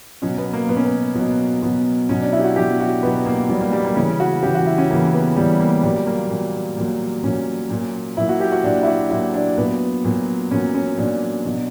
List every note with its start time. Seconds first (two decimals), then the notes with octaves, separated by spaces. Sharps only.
0.22 B2 F#3 C#4
0.38 B3
0.53 A#3
0.69 B2 F#3 B3
0.77 C#4
0.85 B3
1.15 B2 F#3
1.62 B2 F#3
2.09 B2 F#3 C#4
2.21 D4
2.32 E4
2.40 G4
2.44 F#4
2.56 B2 F#3 G4
2.80 F#4
3.03 B2 F#3 B3
3.26 A#3
3.49 B2 F#3 G3
3.61 A#3
3.73 G3
3.85 A#3
3.96 C#3 E3 C#4
4.20 F#4
4.43 C#3 E3 G4
4.55 F#4
4.66 E4
4.78 C#4
4.90 C#3 E3 A#3
5.13 B3
5.36 C#3 E3 G3
5.60 A#3
5.83 A#2 F#3 G3
6.07 A#3
6.30 A#2 F#3
6.77 A#2 F#3
7.24 A#2 F#3 C#4
7.70 A#2 F#3
8.17 A#2 F#3 E4
8.29 F#4
8.40 G4
8.52 F#4
8.64 A#2 F#3 D4
8.83 E4
8.87 F#4
9.11 A#2 F#3 E4
9.34 D4
9.57 A#2 F#3 B3
10.04 A#2 F#3
10.51 A#2 F#3 C#4
10.74 C#4
10.97 A#2 F#3 D4
11.44 B2 F#3